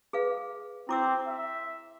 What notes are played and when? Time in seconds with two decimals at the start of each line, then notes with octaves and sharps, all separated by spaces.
0.13 G#4 B4 F5
0.89 C4 E4 D6 E6
1.28 E5